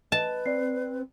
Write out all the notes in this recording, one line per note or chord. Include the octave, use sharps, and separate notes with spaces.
B4 D#5 A5
C4 D5 C7